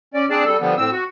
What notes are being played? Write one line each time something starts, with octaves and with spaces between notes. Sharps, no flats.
C#4 D5
C4 D4 G#4 D5 A5
G3 A4
D3 F3 G3 B3
A2 C4 E6
F#4